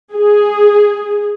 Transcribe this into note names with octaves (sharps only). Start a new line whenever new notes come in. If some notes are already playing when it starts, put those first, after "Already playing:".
G#4